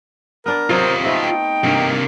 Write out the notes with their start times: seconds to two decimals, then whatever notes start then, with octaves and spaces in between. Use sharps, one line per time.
0.46 B3 D4 A#4 D5
0.70 C3 F#3 F4 C5 C#5 D#5
1.04 A3 B3 C4 D#4 E5
1.22 G5
1.64 G2 C3 A#3